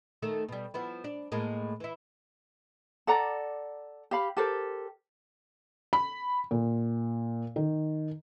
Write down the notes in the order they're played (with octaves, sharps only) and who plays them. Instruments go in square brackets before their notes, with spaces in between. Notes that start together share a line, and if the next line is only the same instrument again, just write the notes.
[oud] D#3 A3 A4
B2 G3
F3 B3 E4
D4
A2 G#3 A#3
E3 E4
[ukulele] A4 D5 F#5 A#5
G4 F5 B5
G4 A4 A#4 C5
[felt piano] B5
A#2
D#3